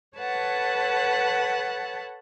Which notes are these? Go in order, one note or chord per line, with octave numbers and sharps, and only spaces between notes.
A4 B4 C#5 F#5 A5